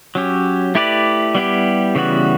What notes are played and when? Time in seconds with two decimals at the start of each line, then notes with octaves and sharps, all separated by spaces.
0.15 F#3 C#4 G4
0.75 A3 E4 G4 B4 D5
1.35 G3 B3 E4 G4
1.95 C#3 E3 G3 B3 F#4